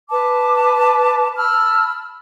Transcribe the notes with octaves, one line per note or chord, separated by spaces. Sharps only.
B4 A5 D6
A5 B5 E6 F6